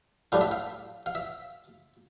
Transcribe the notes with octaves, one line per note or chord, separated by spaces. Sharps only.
A2 G3 D4 F5
E5
F5
F5
E5